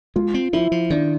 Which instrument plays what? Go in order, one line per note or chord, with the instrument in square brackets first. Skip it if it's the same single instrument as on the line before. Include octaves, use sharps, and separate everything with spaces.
[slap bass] G#3 [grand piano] F4
[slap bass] C4
[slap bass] F3 [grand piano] E4
[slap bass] F3
[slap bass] D#3 [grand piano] D4